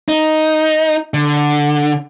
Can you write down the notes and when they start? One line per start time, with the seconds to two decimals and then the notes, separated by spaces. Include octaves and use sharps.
0.09 D#4
1.14 D3